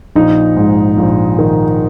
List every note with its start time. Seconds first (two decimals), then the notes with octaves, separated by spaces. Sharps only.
0.16 A#1 D#4
0.57 G#2
0.98 A#1
1.39 D#3